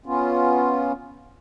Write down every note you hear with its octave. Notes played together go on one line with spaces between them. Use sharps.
B3 C#4 F4